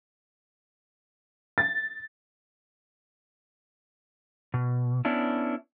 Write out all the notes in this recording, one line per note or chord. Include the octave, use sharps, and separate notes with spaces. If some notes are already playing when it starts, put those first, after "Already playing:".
A6
B2
B3 C#4 D4 E4